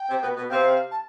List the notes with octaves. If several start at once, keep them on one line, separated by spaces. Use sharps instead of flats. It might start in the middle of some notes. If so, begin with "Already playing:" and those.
Already playing: G5
C3 C4
B2 B3
B2 B3
C3 C4 F5
A5